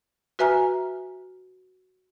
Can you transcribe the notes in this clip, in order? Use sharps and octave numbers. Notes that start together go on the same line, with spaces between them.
F#4 B4 E5 G#5 A#5 F6